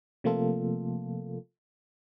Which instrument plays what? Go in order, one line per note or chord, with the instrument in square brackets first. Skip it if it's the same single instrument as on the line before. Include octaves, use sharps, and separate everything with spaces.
[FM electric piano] C3 F3 A3 A#3 F4 A4